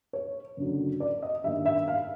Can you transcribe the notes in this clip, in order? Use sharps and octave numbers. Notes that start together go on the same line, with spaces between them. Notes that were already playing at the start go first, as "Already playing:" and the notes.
C#5
F#1 F#2 D3 F#3
D5
D#5
G2 D#3 G3 A#3 E5
E5
F5